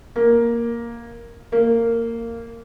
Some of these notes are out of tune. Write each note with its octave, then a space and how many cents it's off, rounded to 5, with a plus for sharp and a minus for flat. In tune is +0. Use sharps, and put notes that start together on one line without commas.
A#3 +5
A#3 -15